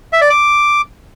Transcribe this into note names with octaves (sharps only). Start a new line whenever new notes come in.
E5
D5
D6